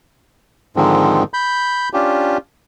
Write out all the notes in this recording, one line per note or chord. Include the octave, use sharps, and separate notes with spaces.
G#2 D3 D#3 F3 G#3 C4
B5 G6
C#4 D4 F4 G4